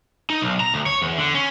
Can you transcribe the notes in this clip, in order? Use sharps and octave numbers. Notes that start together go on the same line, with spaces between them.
D#4
B1
A#5
D2
C#5
E2
D3
C#4